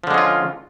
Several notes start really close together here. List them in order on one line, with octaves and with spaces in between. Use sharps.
F3 D3 G#3 C#4 F4